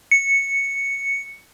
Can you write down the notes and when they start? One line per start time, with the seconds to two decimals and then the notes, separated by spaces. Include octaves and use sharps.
0.11 C#7